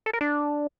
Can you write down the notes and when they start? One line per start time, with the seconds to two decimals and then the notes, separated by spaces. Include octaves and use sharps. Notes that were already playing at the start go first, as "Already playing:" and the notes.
0.06 A4
0.13 A#4
0.21 D4